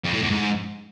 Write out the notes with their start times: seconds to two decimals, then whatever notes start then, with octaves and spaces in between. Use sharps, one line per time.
0.05 F2
0.13 A2
0.22 E2
0.30 G#2